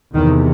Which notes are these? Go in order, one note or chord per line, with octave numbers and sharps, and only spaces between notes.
E2 C3 D#3